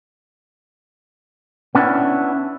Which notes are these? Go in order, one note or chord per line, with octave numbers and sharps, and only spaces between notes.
B3 C#4 D4 E4